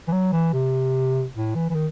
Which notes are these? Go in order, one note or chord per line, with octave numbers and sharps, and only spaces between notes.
E3
F#3
E3
C3
A2
E3
E3
D#3